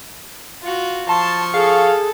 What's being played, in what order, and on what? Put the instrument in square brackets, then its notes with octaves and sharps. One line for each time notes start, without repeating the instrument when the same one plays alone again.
[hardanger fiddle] F4 F#4
[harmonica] F3 C#6 [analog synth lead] A5 [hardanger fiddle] C6
[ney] G#4 [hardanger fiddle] A4 [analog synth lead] F5